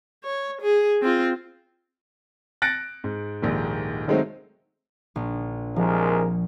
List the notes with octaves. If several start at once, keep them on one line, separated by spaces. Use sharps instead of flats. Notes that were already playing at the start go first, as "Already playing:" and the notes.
C#5
G#4
C4 F4
F#6 A6 A#6 C#7 D7
G#2
D#1 A#1 G#2 D#3
D#3 F#3 G#3 A3 C4 D#4
A#1
C2 F3 G#3 A#4